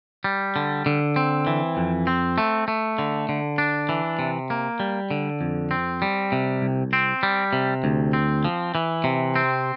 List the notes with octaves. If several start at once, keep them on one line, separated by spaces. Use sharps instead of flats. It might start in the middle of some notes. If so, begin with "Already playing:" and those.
G3
D3
D3
C4
E3
F2
C4
A3
A3
D3
D3
D4
E3
C3
A#3
G3
D3
F2
C4
G3
C3
C2
C4
G3
C3
D2
C4
F3
E3
C3
C4